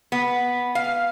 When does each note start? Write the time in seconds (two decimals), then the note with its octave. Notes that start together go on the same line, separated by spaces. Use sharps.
0.12 B3
0.75 F5